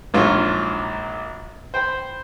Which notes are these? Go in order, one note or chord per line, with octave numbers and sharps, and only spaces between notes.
A#1 G#2 F#3 D4 F4 C#5
C5 G5 B5